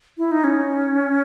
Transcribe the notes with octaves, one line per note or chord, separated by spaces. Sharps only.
E4
D#4
C#4